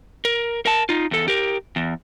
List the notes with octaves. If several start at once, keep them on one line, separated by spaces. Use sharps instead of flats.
A#4
A#4 A5
D#4 F4
E2 A4
G4 A#4
E2